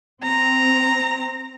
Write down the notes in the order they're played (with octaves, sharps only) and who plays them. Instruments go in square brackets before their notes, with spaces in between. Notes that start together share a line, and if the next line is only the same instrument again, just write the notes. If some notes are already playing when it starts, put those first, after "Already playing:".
[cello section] C4 [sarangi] A#5